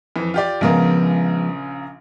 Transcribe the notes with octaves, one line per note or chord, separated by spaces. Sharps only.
F2 E3
F4 G4 D5
A#1 C#3 F3 G#3 B3 A#4